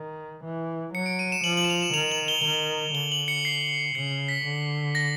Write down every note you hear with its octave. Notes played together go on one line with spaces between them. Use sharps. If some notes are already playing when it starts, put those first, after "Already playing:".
Already playing: D#3
E3
F#3 C#7
D7
D#7
E7
F3 F#7
F#7
E7
F7
E7
D#3 F7
F#7
G7
D#3 G7
D3 G7
F#7
C#7
C7
C#3 C#7
B6
D3
A#6